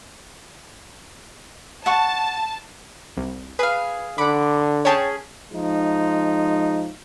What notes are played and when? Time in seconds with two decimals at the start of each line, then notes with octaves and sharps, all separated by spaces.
1.86 F#5 A5 C#6
3.17 C2
3.59 G#4 B4 F5
4.18 D3 F#5 B5 D6
4.85 C#4 G#4 C#5 G5 A5
5.52 F3 G#3 D#4